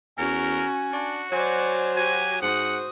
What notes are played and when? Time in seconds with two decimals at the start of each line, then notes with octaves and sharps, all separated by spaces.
0.18 E2 C#4 F#4 A#4 G#5
0.93 D4 F#4
1.32 F#3 C5 D5 G#5
1.96 F#4 G4 G#5
2.42 G#2 F#4 C5 F#5 D#6